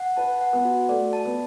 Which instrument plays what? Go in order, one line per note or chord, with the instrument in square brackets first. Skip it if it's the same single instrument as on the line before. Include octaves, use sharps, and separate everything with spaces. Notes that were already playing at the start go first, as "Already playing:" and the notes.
Already playing: [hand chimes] F#5
[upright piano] B4 [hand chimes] A5
[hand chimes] F#5
[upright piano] B3
[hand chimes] F#4
[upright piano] A3 [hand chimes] D5
[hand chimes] A5
[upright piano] B3